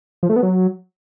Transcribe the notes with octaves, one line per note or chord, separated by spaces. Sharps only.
F3
A3
B3
F#3